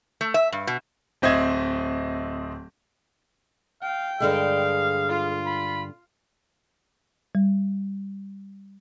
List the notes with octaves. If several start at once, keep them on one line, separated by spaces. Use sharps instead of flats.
A3
E5
G2
B2
D1 C4 D#5 E5 G#6
F5 G5
G2 D3 G#3 G#4 F5
F4
B5
G3